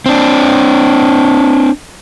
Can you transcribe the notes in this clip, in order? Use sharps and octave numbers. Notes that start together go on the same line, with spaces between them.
C4 D4